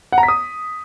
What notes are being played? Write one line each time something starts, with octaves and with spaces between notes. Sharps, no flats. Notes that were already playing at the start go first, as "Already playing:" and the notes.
F#5
A#5
B6
D#6